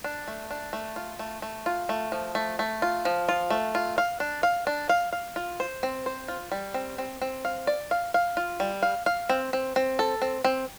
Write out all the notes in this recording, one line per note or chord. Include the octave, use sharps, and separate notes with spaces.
D4
A3
D4
A3
F4
A3
A3
F4
A3
F3
A3
A3
F4
F3
F4
A3
F4
F5
D4
F5
D4
F5
F5
F4
C5
C4
C5
F4
G3
C4
C4
C4
F5
D5
F5
F5
F4
G3
F5
F5
C4
C4
C4
A4
C4
C4